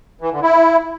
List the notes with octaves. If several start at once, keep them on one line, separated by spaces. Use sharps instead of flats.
E3
D3
E4